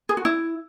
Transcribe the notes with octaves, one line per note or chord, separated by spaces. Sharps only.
G#4
F#4
E4